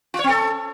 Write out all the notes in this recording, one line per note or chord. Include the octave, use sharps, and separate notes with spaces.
F4
C#5
C4
A4